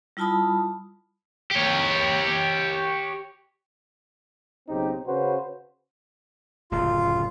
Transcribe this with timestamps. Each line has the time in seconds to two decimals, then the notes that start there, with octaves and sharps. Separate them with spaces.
0.17 G3 E4 F4 A5 B5 D#6
1.51 G4 C#5
4.69 B1 C#3 C4 D#4 G4
5.07 C#3 C#4 F#4 B4 C5
6.72 D1 C#2 F#2 F4